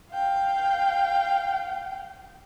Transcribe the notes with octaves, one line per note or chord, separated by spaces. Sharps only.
F5 G5